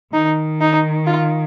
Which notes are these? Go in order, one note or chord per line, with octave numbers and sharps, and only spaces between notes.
D#3 D#4
D#4
F4